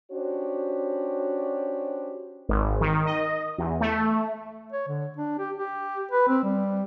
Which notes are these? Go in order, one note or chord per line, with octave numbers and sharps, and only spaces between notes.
C#4 D4 F#4 G4 C5 C#5
G#1
D#3
D#5
E2
A3
C#5
D3
D4
G4
G4
B4
C4
G3